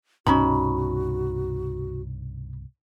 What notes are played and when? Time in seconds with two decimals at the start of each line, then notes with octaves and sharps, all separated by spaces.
0.27 C2 G2 B2 C#4 D#4 F#4 B5